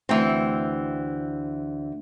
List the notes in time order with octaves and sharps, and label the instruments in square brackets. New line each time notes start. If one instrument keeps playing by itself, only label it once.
[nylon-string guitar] D2 [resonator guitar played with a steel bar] E3 C4